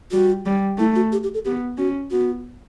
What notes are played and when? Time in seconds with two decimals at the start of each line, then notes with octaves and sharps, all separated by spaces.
0.12 G3 F#4
0.46 G3
0.78 A3 E4
0.95 F#4
1.12 G4
1.23 G4
1.34 A4
1.45 B3 G4
1.78 C#4 F#4
2.11 B3 F#4